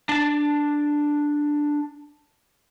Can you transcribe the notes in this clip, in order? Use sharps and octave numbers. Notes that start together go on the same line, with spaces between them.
D4 A5